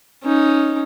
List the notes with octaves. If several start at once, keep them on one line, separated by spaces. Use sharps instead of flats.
C#4 D#4